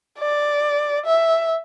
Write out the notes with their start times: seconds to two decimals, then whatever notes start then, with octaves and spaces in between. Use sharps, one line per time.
0.19 D5
1.07 E5